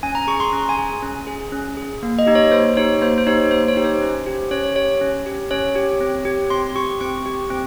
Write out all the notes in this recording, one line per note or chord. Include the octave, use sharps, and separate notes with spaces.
C#4 G#5
A#5
G#4 C#6
C6
C#4 A#5
G#5
G#4
C#4
G#4
C#4
G#4
A#3
D#5
D#4 G4
C#5
A#3 C5
D#4 G4 C#5
A#3 C5
C5
D#4 G4 C#5
A#3 C5
C#5
D#4 G4
C5
C#4
G4
C#4 C#5
C#5
G4 C#5
C#4
G4
C#4 C#5
G4
C4
G4
C4 C6
G4 C#6
C4 C#6
G4
C4